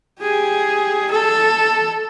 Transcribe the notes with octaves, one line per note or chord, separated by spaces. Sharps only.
G4 G#4
A4